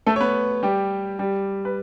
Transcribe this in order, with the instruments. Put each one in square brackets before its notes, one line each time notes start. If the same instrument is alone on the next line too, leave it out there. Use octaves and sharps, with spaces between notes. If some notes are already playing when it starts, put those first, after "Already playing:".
[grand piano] A3 A4
C#5
B3 B4
G3 G4
G3 G4
B4